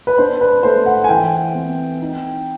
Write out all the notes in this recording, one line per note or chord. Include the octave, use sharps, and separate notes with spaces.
B4
D4 C5
B4
A3 C5
F#5
G#5
E3 G5
C4
D#4